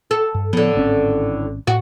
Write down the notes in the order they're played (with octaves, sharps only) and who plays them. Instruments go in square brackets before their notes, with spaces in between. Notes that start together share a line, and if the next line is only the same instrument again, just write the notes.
[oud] A4
[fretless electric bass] G2
[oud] A2 D3 [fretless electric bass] F3 B3
[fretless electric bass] G#1 C4 C#4
[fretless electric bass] A2 [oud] F#4